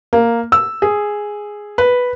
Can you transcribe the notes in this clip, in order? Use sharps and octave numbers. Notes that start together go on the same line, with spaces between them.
A#3
E6
G#4
B4